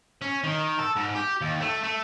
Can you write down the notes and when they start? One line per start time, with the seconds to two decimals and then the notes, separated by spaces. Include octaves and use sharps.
0.22 C#4
0.44 D#3
0.79 A4
0.96 G#2
1.15 G4
1.41 D#2
1.61 A3
1.83 A3